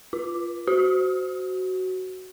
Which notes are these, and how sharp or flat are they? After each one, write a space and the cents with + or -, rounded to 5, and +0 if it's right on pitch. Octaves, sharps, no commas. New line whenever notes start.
F4 -15
F#4 +10